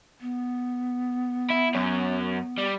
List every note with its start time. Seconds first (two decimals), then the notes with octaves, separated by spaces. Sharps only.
0.21 B3
1.50 E4
1.75 F#2 C#4
2.58 G3